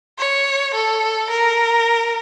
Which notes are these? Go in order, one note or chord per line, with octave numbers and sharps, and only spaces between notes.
C#5
A4
A#4